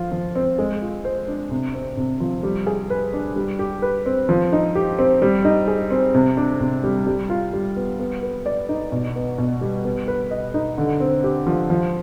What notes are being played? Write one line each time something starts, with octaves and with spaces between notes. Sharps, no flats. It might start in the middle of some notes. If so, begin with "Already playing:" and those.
Already playing: F3 F4
F3
C4
G#3
F4
C5
D4
C3
C4
C3
F3
G3
G#4
B4
D4
G3
G4
B4
C4
F3
D#4
G4
C4
G3
D#4
G#4
C4
C3
D4
C3
G3
G3
F4
G3
B3
B3
B4
D5
D#4
B2
B3
B2
G3
B3
B4
D#5
D#4
D3
C4
G4
F3
F3